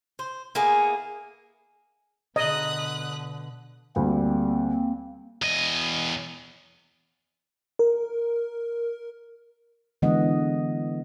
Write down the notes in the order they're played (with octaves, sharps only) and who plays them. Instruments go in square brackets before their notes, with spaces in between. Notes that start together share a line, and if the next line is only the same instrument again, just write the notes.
[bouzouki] C5
A#3 B3 E4 G#4
[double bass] B2 D3 [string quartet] B4 D#6 F#6 [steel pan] D#5
[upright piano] D2 [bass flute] G3 [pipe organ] A#3 C4
[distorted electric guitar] E2 D#5
[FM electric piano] A#4
[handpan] D3 E3 G#3 B3 D#5 F#5